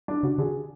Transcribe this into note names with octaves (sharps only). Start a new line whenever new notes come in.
D4
C#3 F#4
D3 G#4